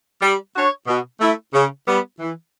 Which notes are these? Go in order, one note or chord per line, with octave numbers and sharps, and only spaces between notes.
G3
D4 F#4 C#5
B2
A3 E4
C#3
G3 B3
E3